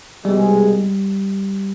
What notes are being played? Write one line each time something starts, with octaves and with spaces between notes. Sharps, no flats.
C2 B2 G3 G#3